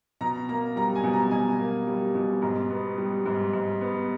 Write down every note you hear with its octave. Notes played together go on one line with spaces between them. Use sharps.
B2 A#5
A#3 A#5
G3 A#5
G#5
B2
A#5
B2 G#5
A#3
G3
B2
G#2 A#5
B3
G3
G#2
G#2
B3